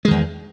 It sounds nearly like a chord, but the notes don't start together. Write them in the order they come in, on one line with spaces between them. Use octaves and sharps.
G#3 D#3 E2